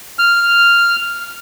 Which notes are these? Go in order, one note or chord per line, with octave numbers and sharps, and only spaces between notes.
F6